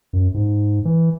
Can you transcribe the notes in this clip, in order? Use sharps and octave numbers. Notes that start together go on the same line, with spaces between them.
F#2
G#2
E3